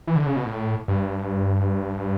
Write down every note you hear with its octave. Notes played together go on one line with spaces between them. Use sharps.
E3
D3
C#3
B2
A2
G2